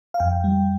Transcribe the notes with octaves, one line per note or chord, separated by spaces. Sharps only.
F5
F2 G5
G3